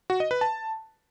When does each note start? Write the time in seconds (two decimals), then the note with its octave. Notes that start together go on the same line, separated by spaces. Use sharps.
0.10 F#4
0.20 D#5
0.31 B4
0.41 A5